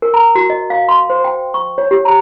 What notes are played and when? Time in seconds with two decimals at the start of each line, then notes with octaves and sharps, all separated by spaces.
0.02 A#4
0.14 A#5
0.35 F#4
0.50 D#5
0.70 F5
0.89 C6
1.10 C5
1.24 G5
1.54 C#6
1.78 C#5
1.91 G4
2.05 A#5